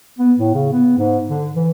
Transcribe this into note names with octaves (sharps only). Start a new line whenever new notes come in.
B3
A2
C#3
B3
G#2
D3
E3